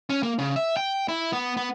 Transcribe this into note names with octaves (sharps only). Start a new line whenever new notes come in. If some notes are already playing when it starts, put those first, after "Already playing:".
C#4
A#3
C#3
E5
G5
E4
B3
B3